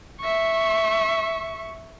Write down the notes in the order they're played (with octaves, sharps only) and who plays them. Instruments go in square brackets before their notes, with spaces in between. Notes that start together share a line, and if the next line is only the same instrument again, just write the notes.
[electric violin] E5 C#6